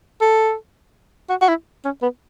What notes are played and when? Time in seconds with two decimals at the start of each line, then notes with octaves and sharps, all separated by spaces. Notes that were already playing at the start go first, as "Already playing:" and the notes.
0.21 A4
1.30 F#4
1.42 F#4
1.49 E4
1.85 C#4
2.02 B3